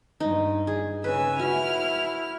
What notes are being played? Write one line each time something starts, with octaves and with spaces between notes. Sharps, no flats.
G2 D#4
G#4
C#3 B4 G#5 E6
E4 F#4 F6